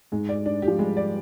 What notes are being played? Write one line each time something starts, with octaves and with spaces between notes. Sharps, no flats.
G#2 G#3
D5
D4
G4
F3
G3 G#3
D5